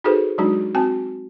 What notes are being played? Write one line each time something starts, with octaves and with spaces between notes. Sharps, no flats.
D#4 F#4 G#4 A4 B4 C5
F#3 G#3 D4 D#4 F#4
C4 F#4 G#5 A5